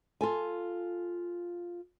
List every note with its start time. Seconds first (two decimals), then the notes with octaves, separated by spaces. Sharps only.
0.21 F4 A4 G#5